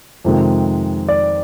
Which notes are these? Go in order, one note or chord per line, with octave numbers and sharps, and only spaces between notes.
F2 C3 D#3 G#3
D5